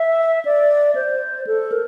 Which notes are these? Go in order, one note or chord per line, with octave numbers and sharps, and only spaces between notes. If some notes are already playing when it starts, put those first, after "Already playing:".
Already playing: E5
D5
C5
A4
A#4